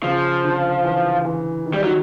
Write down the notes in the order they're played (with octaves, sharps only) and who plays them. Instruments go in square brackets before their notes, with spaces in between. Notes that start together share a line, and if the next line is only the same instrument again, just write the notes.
[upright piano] C#3 [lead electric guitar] F3
[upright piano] D3
E3
E3
D#3
[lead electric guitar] G3
[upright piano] D#3 [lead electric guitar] F#3